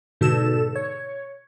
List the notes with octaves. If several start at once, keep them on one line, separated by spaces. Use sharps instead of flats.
G#2 B2 D3 A4 E7
C#5